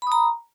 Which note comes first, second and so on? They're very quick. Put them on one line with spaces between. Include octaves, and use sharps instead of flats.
B5 D#6 A#5